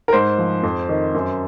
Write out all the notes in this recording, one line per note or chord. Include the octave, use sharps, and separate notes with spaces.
A#4
G#2 C5
F3
F2
D#3
F#2